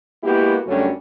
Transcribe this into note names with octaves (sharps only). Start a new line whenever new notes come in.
G#3 A#3 B3 E4 F#4 G4
F#2 D3 G3 A3 C#4 F#4